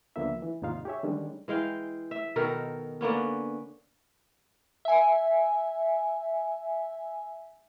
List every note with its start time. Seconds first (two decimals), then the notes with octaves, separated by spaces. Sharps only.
0.16 C#2 D3 F3 A#3 B3 E5
0.42 E3
0.62 D#2 G#2 C3 D#4 F4 F5
0.85 G4 G#4 C#5 E5
1.03 D3 D#3 G3 G#3 C#4 D4
1.48 E3 G#3 F5 G5
2.11 E5
2.36 B2 D#3 A4 A#4
3.01 D3 A#3 B3 C#4
4.85 E5 G#5